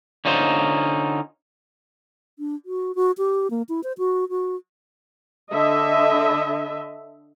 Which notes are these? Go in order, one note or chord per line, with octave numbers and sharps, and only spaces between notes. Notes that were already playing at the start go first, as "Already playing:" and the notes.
D3 C#4 D#4 F4 C5
D4
F#4
F#4
G4
A#3
E4
C5
F#4
F#4
D3 D#5 E5